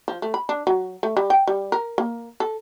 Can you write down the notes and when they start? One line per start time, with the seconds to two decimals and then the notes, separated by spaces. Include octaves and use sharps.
0.08 F3
0.22 A3
0.34 B5
0.49 D4
0.67 F#3
1.03 A3
1.17 G3
1.30 G5
1.47 G3
1.72 A#4
1.98 A#3
2.40 A4